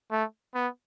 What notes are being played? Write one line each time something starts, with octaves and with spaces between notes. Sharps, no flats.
A3
B3